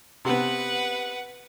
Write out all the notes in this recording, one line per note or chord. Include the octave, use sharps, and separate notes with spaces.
C3 B3 B4 F#5